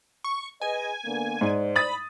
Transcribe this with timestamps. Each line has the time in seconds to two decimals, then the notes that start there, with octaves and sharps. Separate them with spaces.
0.24 C#6
0.61 G#4 B4 D#5 G#5
1.04 D3 A#3 B3
1.41 G#2 C5 D5
1.76 B5 D#6 A6